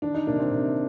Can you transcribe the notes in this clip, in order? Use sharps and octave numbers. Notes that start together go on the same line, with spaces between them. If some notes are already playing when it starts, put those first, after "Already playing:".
D#3 D4
D#4
C3 A#3 D4
C4 D#4
C3